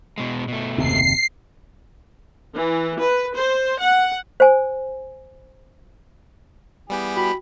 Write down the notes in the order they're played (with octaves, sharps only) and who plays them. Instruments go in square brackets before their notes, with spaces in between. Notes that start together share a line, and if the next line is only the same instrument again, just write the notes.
[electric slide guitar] B2 G#3
B2 A3
[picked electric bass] F#1 D#2 C3 [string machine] C7
[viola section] E3
B4
C5
F#5
[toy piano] C5 G#5
[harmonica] E3 G#4 [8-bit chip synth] G3 B3 G4
[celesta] F#4 G5 [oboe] B5